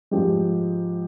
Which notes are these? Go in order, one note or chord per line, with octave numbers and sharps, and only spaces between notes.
G#2 F3 G#3 G4